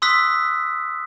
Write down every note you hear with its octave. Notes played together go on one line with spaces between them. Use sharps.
C6 D#6 E6 F#6 B6